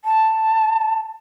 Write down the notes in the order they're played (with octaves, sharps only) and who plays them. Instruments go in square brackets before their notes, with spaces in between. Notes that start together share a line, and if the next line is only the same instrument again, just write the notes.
[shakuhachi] A5